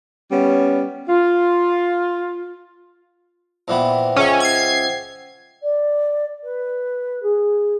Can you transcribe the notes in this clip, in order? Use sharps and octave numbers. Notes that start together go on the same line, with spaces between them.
G3 B3 C#4
F4
A#2 E3 B3 C5 F#5 G5
C#2 C#4 E5
G#6 C7
D5
B4
G#4